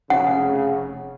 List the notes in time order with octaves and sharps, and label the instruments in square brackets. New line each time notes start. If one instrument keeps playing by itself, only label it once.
[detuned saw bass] F1 [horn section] C#3 [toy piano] F#5